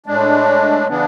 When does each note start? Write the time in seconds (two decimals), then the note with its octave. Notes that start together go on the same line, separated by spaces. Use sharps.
0.06 A2 G#3 D4
0.88 C#3 E3 B3 D4